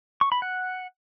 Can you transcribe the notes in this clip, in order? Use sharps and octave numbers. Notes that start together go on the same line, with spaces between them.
C#6
B5
F#5